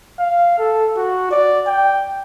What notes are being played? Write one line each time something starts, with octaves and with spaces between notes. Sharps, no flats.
F5
A4
F#4
D5
G5